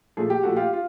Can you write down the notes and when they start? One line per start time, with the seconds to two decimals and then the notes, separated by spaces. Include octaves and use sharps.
0.17 A#2 F3 A3 G#4
0.30 G4
0.43 A#2 F3 A3 F#4
0.56 F4 G4
0.73 F4